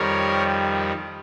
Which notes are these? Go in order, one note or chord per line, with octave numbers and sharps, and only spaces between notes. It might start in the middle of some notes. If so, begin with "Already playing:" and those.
Already playing: F2 D#3 G3 A#4 C#5